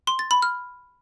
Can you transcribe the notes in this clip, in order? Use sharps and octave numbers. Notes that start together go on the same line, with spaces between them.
C6
A6
B5
F6